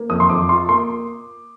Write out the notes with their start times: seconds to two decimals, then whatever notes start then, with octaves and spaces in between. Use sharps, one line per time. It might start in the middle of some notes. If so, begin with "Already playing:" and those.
Already playing: A#3
0.10 F2 D#6
0.20 C6
0.30 F2 D6
0.49 F4 C6
0.69 A#3 C6